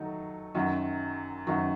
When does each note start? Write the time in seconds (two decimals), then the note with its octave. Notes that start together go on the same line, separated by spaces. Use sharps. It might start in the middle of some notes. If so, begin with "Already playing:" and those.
Already playing: D#3 F#3 A3 D#4
0.55 F#2 D#3 F#3
1.47 F#2 D#3 F#3